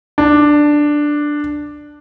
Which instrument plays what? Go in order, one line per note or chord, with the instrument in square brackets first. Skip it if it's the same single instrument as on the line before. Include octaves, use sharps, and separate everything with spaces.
[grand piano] D4